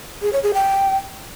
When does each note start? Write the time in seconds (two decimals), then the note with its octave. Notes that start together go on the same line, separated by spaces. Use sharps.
0.22 G#4
0.33 C#5
0.43 G#4
0.54 G5